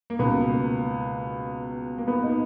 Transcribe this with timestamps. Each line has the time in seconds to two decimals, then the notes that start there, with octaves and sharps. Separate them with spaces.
0.10 A#3
0.19 C#2 B2 B3
0.50 A#3
1.98 A#3
2.08 B3
2.23 D#4